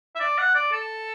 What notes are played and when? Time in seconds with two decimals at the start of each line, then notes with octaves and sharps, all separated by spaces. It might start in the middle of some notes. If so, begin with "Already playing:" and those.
0.16 E5
0.20 D5
0.38 F#5
0.55 D5
0.72 A4